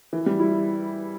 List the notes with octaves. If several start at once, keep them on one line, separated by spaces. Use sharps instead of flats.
E3
G3
E4